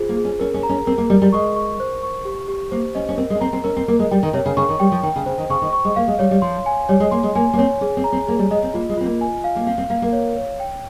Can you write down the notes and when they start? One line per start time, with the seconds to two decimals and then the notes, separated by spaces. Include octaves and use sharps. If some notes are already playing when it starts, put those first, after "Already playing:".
Already playing: F4 G#4 C5
0.09 A#3
0.17 G#4
0.25 C#4
0.40 C#4 A#4
0.54 C#4
0.63 A#5
0.69 C#4
0.87 C4 A#4
0.98 A#3
1.10 G3 A#4
1.22 G3
1.32 G#3 C#6
1.56 C#6
1.80 C5
2.03 C#6
2.25 G4
2.48 G4
2.71 A#3 C5
2.95 C#4 D#5
3.09 C#4
3.18 C4 A#4
3.30 G#3
3.35 C#4
3.41 C4 A#5
3.53 C4
3.64 C#4 A#4
3.76 C4
3.88 A#3 A#4
3.99 G#3
4.11 G3 G5
4.23 D#3
4.33 C3 C#5
4.46 C#3
4.57 C#3 C#6
4.69 D#3
4.80 G3 G5
4.92 F3
5.03 D#3 G5
5.16 C#3
5.26 C#3 C5
5.38 D#3
5.50 C#3 C#6
5.62 D#3
5.73 C#6
5.85 G#3
5.96 A#3 F5
6.08 G#3
6.19 G3 C#5
6.31 G3
6.42 F3 C6
6.66 G#5
6.89 G3 C#5
7.00 G#3
7.11 A#3 C6
7.23 G#3
7.35 A#3 G#5
7.53 A#3
7.58 C4 C#5
7.81 C#4 G#4
7.97 C4
8.04 A#5
8.12 C4
8.27 A#3 G#4
8.39 G3
8.51 G#3 D#5
8.63 C4
8.74 A#3 F4
8.89 G#3
8.97 C4 F4
9.05 A#3
9.21 G#5
9.44 F5
9.56 A#3
9.66 C4 F5
9.78 C4
9.90 A#3 F5
10.02 A#3
10.13 C#5
10.37 C#5
10.60 G5